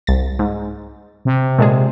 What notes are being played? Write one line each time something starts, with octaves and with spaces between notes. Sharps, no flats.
C2 A6
G#2
C3
A#2 G#3 G#4